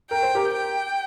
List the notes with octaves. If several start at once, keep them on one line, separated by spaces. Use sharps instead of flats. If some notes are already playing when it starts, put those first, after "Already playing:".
A#4 G5
C5
G4 A#4
G5